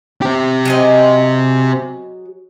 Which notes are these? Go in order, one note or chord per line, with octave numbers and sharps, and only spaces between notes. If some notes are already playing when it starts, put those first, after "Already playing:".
C4 G4
F#3 G#4 D#5